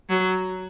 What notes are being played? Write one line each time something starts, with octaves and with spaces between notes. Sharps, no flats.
F#3